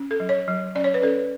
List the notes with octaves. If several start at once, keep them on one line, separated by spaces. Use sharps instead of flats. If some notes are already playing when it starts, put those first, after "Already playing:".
Already playing: C#4
A4
F#3
C#5
F#3
C#4 D5
C#5
B4
C#4 A4